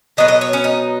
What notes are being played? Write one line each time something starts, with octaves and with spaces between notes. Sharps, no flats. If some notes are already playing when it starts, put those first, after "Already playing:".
B2 F#3 B3 D#5
D#5
C#5
C#4
D#4